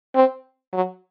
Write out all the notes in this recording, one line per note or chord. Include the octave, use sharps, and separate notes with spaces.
C4
F#3